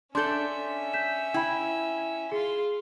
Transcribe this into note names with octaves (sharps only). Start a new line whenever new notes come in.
C#4 D4 A4 E5 C6 G6 G7
G6 B6 E7
E4 G5 B5
F4 G#4 C6